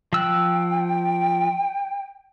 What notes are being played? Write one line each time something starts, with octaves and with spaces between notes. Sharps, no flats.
F3 G5 E6 F#6